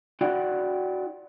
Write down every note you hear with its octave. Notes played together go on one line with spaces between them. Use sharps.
E4 F#4 D5 F#5 G5